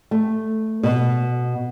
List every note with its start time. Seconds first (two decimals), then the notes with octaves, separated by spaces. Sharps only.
0.11 A3
0.83 B2